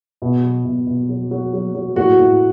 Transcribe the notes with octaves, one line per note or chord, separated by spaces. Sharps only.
B2
F#3
B2
B2
F#3
F#3
F#3
F#3
A2 F#4
A2